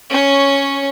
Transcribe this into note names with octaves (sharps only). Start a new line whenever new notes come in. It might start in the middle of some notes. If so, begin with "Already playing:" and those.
C#4 C#5